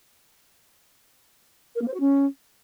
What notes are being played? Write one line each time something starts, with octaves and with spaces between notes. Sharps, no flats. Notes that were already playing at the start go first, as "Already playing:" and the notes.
A#4
A#3
C5
F#4
C#4